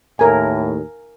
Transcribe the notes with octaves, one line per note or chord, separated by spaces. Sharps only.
D#2 A2 A#4 G#5